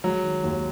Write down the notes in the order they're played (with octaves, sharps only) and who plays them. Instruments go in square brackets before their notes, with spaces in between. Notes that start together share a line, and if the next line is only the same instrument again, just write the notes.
[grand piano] F#3 [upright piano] G#3
[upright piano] D#3
D#2